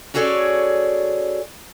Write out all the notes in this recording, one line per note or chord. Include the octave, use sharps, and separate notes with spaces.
C#4 F#4 G#4 A4 C#5 D5